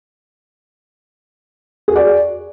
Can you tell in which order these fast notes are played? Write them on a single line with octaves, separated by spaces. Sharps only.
G#4 F#4 D5